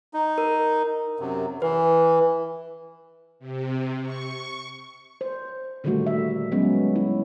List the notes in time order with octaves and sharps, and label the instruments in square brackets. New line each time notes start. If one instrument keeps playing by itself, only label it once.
[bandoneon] D#4
[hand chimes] A#4
[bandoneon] F#2 C3
[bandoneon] E3 [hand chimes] B4
[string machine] C3
C#6
[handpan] C5
A#2 D3 D#3 G3 A3 F#4
E5
F#3 G#3 B3 C#4
E4